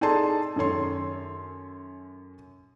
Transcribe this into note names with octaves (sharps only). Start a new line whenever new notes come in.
D#4 G#4 A4 D5 A5 C6
F#2 D#3 A4 C#5 C6